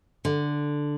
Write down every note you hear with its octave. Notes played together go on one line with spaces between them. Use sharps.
D3